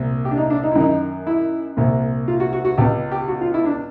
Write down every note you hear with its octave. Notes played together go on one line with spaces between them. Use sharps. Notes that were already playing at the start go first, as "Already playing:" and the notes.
Already playing: C2 A#2
G4
D4
D#4
D4
D#4
E4
F#2 D#3 D#4
E4
C2 A#2
F4
F#4
F#4
F#4
C#2 B2 G4
G4
F#4
F4
E4
D4